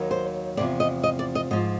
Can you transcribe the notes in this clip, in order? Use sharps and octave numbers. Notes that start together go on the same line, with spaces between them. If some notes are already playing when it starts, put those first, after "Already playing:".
Already playing: D#2 D#3 F#3
C5
E2 C3 F3 D5
D#5
D#5
D5
D#5
G#2 F3 D#5